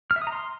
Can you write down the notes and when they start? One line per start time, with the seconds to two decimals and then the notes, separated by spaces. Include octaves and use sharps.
0.11 F6
0.16 E5
0.22 D#6
0.27 A#5
0.32 C6